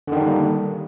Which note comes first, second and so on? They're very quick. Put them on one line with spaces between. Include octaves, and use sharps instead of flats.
D3 D#3 D4 G3 A#3